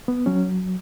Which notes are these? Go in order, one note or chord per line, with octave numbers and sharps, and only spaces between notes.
B3
F#3 C#4